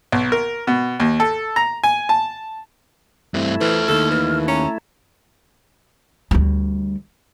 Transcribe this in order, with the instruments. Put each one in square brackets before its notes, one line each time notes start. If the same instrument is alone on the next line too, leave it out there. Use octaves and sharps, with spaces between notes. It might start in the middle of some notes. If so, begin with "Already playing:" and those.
[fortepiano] B1
A#4
B2
D#2
A4
A#5
G#5
A5
[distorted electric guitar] G2 C4 [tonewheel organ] A3 E4
[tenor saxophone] E3 [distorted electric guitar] A4 C5 [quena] F6
[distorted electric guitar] D#2 D#3 [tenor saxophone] A4
[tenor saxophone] E3
[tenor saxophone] C#4 [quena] A#5
[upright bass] D2 G3